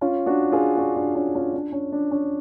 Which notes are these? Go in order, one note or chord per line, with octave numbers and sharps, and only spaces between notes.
C#4 F4
D4 F#4
F4 G#4
D4 F#4
D4 F#4
C#4 F4
C#4 F4
D4
C#4
D4
C#4